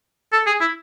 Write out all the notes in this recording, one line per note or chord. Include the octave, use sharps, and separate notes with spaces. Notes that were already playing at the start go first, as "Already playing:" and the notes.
A4
G#4
E4